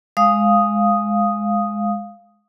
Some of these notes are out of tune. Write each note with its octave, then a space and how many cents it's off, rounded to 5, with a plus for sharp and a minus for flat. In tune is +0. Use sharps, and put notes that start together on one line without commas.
G#3 +0 F5 +0 D#6 +0